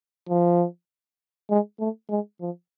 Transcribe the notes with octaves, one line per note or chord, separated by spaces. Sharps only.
F3
G#3
A3
G#3
F3